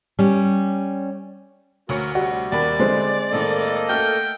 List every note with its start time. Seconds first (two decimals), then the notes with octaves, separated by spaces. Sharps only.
0.19 G3 C#4
1.89 D2 A#3 F#4 A#4 C#5 C#7
2.15 C3 G3 F#4
2.52 D#2 A#3 D5 B5
2.80 D3 G#3 C4
3.32 A2 D#3 A#3 A4 D#5
3.89 A3 F#4 G5 F6